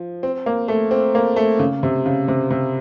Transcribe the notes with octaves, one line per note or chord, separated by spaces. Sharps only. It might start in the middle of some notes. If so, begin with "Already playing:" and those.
Already playing: F3
C4
A#3
A3
C4
A#3
A3
C#3
C3
C#3
C3
C3